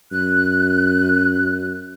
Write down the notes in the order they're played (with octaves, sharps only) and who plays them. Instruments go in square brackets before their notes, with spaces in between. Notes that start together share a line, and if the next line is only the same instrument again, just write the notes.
[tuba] F#2 [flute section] F#6